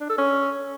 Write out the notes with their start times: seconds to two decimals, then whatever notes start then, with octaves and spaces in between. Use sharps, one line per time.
0.01 D4
0.09 A4
0.18 C#4